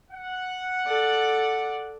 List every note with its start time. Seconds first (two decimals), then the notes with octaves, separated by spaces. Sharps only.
0.11 F#5
0.87 A4 D5